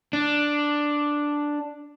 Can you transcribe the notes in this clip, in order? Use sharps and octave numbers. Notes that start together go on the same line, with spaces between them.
D4